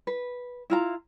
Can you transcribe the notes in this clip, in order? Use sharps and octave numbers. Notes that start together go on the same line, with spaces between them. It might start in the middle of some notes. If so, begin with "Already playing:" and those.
B4
E4 F4 A#5